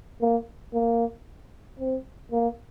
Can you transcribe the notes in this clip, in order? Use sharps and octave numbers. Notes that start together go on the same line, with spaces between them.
A#3
A#3
C4
A#3